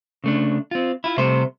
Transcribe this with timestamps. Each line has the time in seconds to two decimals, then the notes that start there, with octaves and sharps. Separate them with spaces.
0.24 C#3 A3 D4
0.71 C4 F4
1.04 E4 F4
1.18 C2 C3 A3 C5